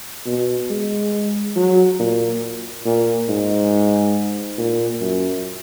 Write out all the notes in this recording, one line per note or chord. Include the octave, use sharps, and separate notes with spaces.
B2
G#3
F#3
A#2
A#2
G#2
A#2
F#2